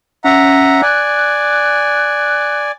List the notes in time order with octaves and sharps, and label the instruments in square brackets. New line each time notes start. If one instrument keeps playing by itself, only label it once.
[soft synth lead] C#4 [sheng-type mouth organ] E5 F#5 A#5
[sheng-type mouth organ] D5 G#5 [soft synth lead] F#6